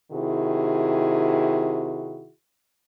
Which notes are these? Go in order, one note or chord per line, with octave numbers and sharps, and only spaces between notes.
C3 D#3 E4 F#4 G#4